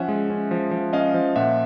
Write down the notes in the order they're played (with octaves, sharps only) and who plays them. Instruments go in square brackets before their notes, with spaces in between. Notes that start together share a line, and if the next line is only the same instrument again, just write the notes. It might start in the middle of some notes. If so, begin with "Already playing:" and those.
Already playing: [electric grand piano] F3 C#4 E5 F#5
G#3
C#4
F3
F3
C#4 D#5 F5
F3
A#2 E5 F#5